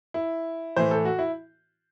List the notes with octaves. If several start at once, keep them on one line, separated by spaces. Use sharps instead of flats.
E4
A2 E3 C5
A4
F#4
E4